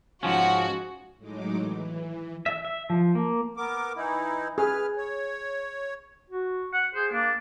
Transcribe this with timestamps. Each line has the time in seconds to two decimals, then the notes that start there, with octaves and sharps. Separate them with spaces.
0.23 G#2 F3 C#4 F#4
1.18 A2 F#3 G#3 D#4 D6
1.56 E3
2.46 E5
2.65 E5
2.90 F3
3.15 A#3
3.57 B3 A#4 D6
3.96 E3 D#4 E4
4.58 G#4 B4 F6
4.97 C#5
6.30 F#4
6.73 F#5
6.94 G#4 C5
7.12 A#3 D4